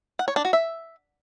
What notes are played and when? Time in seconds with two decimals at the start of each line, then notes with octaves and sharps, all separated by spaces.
0.19 F#5
0.28 C#5
0.36 D4
0.45 F#4
0.53 E5